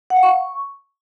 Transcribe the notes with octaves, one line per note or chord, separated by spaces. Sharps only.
F#5
F5
C#6